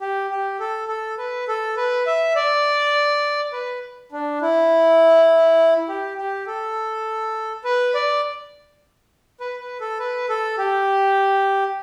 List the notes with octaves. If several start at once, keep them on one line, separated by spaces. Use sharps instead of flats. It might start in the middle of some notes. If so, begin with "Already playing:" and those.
G4
G4
A4
A4
B4
A4
B4
E5
D5
B4
D4
E4
G4
G4
A4
B4
D5
B4
B4
A4
B4
A4
G4